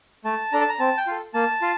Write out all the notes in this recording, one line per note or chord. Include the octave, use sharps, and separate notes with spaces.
A3 A5
D4 A4 A#5
A5
A#5
C4 A5
G5
F4 A4
A#3 A5
F4